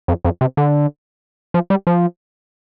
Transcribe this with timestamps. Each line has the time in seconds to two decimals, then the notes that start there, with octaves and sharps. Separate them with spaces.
0.08 F2
0.25 F2
0.41 C3
0.57 D3
1.54 F3
1.70 G3
1.87 F3